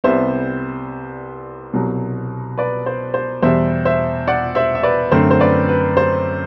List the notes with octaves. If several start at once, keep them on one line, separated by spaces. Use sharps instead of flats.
C2 C3 G3 B3 C5 E5
C2 B2 F#3
B4 D5
C5
C5
E2 B2 G3 C5 E5
C5 E5
D5 F#5
C5 E5
E5
B4 D5
F#2 D3 A3 C4 C5
C5
B4 D5
B4
C5